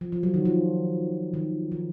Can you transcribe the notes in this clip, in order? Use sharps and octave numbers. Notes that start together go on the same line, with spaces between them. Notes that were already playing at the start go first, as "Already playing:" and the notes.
F3
F3
F#3
D#3
F3
D#3
F3